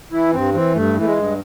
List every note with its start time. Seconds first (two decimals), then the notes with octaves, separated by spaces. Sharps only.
0.12 E3 E4
0.33 G2 C4
0.54 E3 C4
0.75 G2 A3
0.96 E3 A3
1.06 G#3
1.17 G2